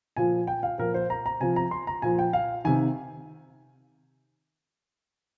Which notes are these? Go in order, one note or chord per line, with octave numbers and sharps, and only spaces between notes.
A#2 F3 G#5
G5
F5
A#2 F3 A#4
C5
A#5
A#5
C3 F3 G#5
A#5
C6
A#5
A#2 F3 G#5
G5
F5
C3 D#3 G#5